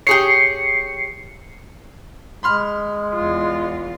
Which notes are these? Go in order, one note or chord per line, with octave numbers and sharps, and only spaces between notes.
G4 G#4 C#5 C7 C#7
G#3 B5 C6 F6
E2 F4